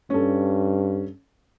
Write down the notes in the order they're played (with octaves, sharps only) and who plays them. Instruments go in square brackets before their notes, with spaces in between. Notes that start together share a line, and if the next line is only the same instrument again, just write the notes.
[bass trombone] G2 [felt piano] C#4 A4